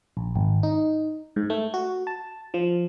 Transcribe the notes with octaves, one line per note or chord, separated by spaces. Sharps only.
A#1
G#1
D#4
G#2
A3
F#4
A5
F3